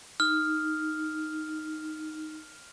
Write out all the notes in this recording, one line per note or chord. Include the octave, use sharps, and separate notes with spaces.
D#4 F6